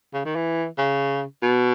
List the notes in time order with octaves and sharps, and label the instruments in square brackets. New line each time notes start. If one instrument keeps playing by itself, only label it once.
[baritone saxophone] C#3
D#3
E3
C#3
B2